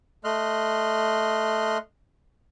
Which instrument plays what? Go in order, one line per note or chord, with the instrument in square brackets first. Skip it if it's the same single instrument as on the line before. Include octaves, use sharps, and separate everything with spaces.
[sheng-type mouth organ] A3 D#5 C6 F6 F#6